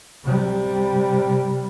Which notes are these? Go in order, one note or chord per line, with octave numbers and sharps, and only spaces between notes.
C3 G3